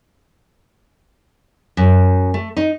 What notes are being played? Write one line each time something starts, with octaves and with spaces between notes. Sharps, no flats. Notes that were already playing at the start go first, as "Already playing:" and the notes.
F#2
A3
D#4